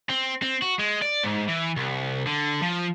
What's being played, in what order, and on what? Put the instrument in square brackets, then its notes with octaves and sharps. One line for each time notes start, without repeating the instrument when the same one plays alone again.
[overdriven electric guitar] C4
C4
F#4
G#3
D5
G#2
E3
C2
D3
F3